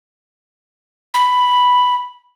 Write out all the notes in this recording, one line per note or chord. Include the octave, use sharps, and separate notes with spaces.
B5